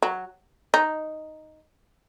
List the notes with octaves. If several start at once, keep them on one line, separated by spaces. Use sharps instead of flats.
F#3
D#4